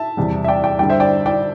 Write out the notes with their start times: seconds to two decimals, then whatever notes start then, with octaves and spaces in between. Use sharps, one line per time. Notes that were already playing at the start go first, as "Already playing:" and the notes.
Already playing: E5 A5
0.17 E2 C3 G3
0.44 E5
0.48 D5 G5
0.64 D5 G5
0.79 G2 D3 G3 D5 G5
0.89 C5 E5
1.00 D5 G5
1.26 D5 G5